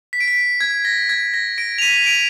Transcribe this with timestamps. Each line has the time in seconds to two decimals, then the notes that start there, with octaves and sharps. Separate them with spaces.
0.13 B6
0.20 D7
0.28 B6
0.61 G#6
0.85 A#6
1.09 G#6
1.34 A#6
1.58 A#6 D7
1.78 F7
1.82 B6 D#7
2.06 D7 F7